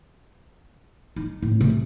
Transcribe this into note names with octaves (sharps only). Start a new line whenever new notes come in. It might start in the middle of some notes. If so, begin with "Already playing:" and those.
D#4
A2
C3